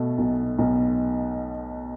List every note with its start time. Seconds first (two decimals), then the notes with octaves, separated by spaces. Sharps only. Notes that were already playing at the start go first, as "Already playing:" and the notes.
Already playing: B2 A3
0.18 B1
0.59 B1